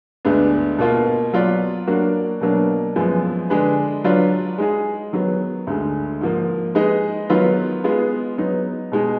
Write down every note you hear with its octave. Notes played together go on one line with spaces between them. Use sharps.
D2 D3 G#3 B3 D4
B2 A#3 F4
F#3 B3 F4 B4 D5
F#3 A#3 D4 F#4
B2 F#3 A#3 D4
F#2 F3 G#3 B3
D3 G#3 D4 G#4 B4
F#3 D4 F4 B4 D5
G#3 D#4 G#4
D#3 F#3 B3
D2 D3 G#3
G#2 F3 A#3
G#3 D#4 G#4 B4 D#5
D#3 F#3 B3 F4 B4
G#3 B3 F4 G#4
F#3 B3 D#4
B2 G#3 D#4 G#4